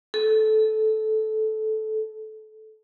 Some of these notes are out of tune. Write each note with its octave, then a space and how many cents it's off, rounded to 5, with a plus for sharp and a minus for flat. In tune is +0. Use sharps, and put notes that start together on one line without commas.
A4 -15